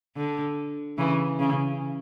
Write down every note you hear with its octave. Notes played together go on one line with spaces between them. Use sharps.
D3
C#3 E3
C#3